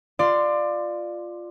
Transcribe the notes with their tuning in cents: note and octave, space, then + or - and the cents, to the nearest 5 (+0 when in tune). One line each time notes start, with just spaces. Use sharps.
F4 +0 D5 +20 C6 -10